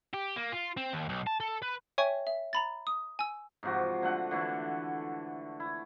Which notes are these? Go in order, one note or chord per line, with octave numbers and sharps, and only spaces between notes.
G4
A#3
F4
C4
D#2
B1
A5
A4
B4
C#5 E5 G5 G#5 C#6
E5
A#5 B5 A6
D#6
G#5 E6
G#2 C3 F3 F#4
D3 A3 F#5
D3 E3 A3
E4